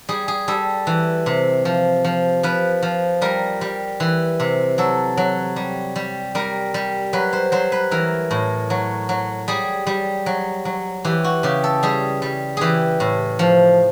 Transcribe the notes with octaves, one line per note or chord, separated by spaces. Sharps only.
G3 G#4
G#4
G3 A4
E3
C3
F3
F3
F3 B4
F3
G3 A#4
G3
E3
C3
F#3 A4
F#3
G3
G3
G3 A#4
G3
F#3 B4
C5
F#3 C5
B4
E3 A#4
A2
F#3
F#3
G3 G#4
G3
F#3
F#3
E3 G4
F#4
C#3 G4
A4
G3 G#4
G3
E3 G4 G#4
A2
F3